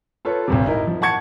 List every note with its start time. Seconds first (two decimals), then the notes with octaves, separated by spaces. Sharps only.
0.25 F4 A4 B4 C#5
0.48 G#1 D2 C3
0.66 D#4 E4 A#4
0.87 F3
1.02 F#5 A5 C#6 G#6 C#7